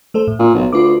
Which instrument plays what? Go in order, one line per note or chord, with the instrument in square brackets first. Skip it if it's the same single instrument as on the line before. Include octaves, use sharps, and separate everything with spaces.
[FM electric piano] A3 A4 C5
A2
[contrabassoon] A#2
B1
[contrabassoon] D2 [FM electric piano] F4 B4 D6